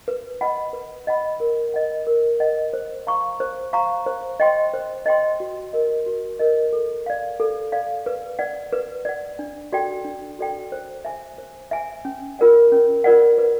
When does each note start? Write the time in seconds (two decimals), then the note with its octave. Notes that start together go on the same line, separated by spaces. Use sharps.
0.08 B4
0.41 D#5 F#5 B5
0.73 B4
1.07 D#5 F#5 B5
1.40 A#4
1.74 D#5 F#5
2.07 A#4
2.40 D#5 F#5
2.73 C5
3.07 F5 A#5 C#6
3.40 C5
3.73 F5 A#5 C#6
4.06 C5
4.40 D#5 G5 C6
4.74 C5
5.06 D#5 G5 C6
5.40 F#4
5.73 A#4 D#5
6.06 F#4
6.39 A#4 D#5
6.73 A4
7.06 D5 F5
7.40 A4
7.72 D5 F5
8.06 B4
8.39 D5 F#5
8.73 B4
9.05 D5 F#5
9.39 D4
9.72 F#4 A4 D5 G5
10.05 D4
10.39 F#4 A4 D5 G5
10.72 C5
11.05 E5 G#5
11.38 C5
11.71 E5 G#5
12.05 C#4
12.39 F4 A#4 D5 F#5
12.72 C#4
13.04 F4 A#4 D5 F#5
13.38 B4